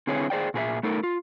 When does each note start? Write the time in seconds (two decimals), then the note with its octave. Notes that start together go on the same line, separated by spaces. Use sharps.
0.07 D3 C4 E4 G#4 B4 C#5
0.30 G#4 C5 D5 G5
0.54 A#2 G#4 A#4 E5
0.83 A3 D#4 A4 A#4
1.03 F4